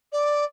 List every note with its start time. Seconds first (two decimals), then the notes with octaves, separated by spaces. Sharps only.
0.12 D5